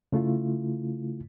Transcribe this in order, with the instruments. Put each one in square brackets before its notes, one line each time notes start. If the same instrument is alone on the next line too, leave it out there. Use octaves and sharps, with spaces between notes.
[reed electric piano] C#3 A3 E4 F4